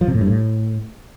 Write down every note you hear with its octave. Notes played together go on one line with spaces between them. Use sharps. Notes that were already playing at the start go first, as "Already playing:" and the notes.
F3
C3
A2
G2
A2